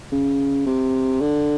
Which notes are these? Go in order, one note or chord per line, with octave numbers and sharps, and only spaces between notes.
C#3
C3
D3